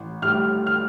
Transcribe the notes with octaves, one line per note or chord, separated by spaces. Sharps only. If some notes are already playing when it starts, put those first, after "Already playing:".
Already playing: A1
A2 G3 F6
F6